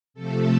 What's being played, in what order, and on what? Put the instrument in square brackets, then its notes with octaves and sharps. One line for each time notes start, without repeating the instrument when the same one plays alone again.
[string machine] C3 F3 A3 A4